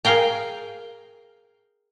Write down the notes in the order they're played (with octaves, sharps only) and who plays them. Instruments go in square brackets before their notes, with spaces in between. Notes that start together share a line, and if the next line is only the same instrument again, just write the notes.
[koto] G#4 A#4 F5 G5 A#5